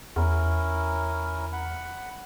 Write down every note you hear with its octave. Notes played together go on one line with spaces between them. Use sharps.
E2 C#4 E4 A#4
F#5 B5